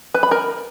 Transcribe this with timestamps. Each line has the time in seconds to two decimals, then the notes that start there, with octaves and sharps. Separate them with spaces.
0.14 B4
0.23 B5
0.31 A#4